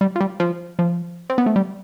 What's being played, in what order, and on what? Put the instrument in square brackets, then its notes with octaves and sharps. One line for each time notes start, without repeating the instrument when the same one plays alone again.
[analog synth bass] G3
F3
G3
F3
F3
C4
B3
A3
G3